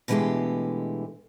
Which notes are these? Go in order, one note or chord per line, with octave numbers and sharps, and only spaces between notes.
B2 D3 E3 G#3 A3 G4